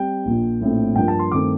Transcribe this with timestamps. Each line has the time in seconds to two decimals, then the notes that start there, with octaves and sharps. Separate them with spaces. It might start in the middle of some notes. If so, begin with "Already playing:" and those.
Already playing: G3 C4 G5
0.25 A#1 A#2 F3
0.61 A#1 A2 F3 C4
0.95 G2 F3 A#3 G5
1.08 A5
1.19 C6
1.31 G2 D#3 A3 C4 D6